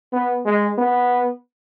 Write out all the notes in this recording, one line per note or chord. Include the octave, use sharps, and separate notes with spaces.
B3
G#3
B3